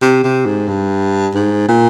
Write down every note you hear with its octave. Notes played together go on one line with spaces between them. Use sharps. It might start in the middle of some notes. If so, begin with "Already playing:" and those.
C3
C3
G#2
G2
G#2
A#2